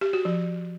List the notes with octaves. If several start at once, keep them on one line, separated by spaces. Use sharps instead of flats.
G4
F#4
F3